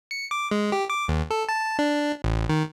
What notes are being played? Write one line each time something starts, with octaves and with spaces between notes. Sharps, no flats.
C#7
D6
G#3
G4
D6
D#2
A4
A5
D4
A1
D#3